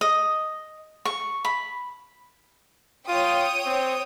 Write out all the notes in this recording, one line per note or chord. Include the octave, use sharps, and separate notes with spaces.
D#5
C#6
B5
F4 C#5 G5 D#6
C4